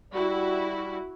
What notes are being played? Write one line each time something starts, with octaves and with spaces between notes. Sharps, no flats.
G3 E4 F#4